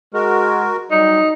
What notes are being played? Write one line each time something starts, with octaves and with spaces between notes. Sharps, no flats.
G#3 F#4 A#4
F#3 G3 D#4